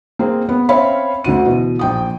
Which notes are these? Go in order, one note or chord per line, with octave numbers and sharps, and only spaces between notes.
A#3 C4 G#4
B3
C4 C#4 C#5 E5 F5 B5
D2 D3 F#4 D#7
B2 E3
A#1 G5 D#6